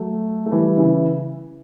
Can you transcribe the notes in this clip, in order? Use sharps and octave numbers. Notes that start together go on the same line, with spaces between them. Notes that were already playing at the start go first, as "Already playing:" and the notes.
Already playing: F#3 A3
A3
E3 G3
C#3 E3